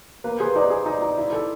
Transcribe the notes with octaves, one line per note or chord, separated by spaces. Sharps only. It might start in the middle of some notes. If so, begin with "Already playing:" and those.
A#3 B4
G#4 C5
D#4 D5
G#4
D#4
D#4
E4
A4